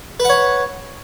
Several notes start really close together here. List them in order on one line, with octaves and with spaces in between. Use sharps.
B4 F#5 C#5